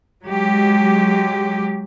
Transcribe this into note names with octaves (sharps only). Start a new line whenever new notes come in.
F#3 G#3 G4